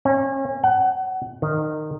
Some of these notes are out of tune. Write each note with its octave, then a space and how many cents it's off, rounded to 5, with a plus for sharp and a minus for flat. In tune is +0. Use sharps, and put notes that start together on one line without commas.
C#4 -35
F#5 +25
D#3 -20